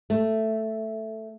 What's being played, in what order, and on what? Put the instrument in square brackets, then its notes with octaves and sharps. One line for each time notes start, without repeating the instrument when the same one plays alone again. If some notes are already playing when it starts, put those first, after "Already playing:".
[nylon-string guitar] A3